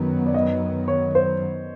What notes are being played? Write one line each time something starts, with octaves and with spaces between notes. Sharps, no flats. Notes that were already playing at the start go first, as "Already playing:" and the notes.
Already playing: F#2 D#3 F#3 B3
D5
D#5
C#5
C5